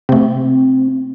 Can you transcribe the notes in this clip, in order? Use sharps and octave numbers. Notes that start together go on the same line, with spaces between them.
C3 A3 C4